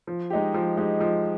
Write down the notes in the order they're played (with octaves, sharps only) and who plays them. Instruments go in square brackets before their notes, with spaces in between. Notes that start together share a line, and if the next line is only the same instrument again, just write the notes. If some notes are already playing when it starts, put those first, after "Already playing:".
[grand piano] F3
G#3 D#4 G4
F3
G#3 D#4 G4
F3